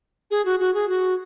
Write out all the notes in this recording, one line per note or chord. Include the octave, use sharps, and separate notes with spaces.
G#4
F#4
F#4
G#4
F#4